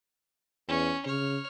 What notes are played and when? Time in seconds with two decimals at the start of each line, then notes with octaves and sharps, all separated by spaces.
0.68 E2 C#4
1.06 C#3 C#5 F6